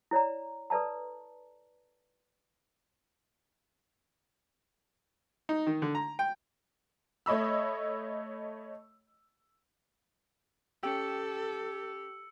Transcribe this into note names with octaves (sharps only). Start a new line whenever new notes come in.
E4 C#5 D5 A#5
A4 B4 D5 A5 A#5
D#4
D#3
D3
A#5
G5
A3 C#5 D#5 B5 E6
C#4 G4 A4 G5 E6 C#7